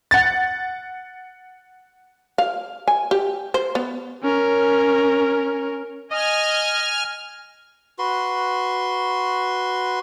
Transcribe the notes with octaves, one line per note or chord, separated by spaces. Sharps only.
F#5 A6
F5
G#5
G4
C5
B3
C#4 A#4
D#5 G#5 F6
F#4 B4 C6